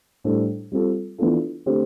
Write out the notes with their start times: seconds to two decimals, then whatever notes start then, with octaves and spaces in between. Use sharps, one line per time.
0.24 A2 G3 D4 A4 C5
0.72 G3 C4 F4 A4
1.18 E3 B3 D4 F4 A4
1.66 D3 A3 C4 G4 C5